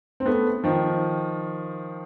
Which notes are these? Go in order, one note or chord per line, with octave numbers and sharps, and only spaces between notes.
C4
A3 B3
D#3 F3